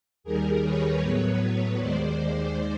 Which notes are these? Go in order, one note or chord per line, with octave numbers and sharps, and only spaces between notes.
D#2 D#3 G3 G#4 A#4
B4 C#5
A2 F#3 B3
D#2 D#3 G#3 C5 D5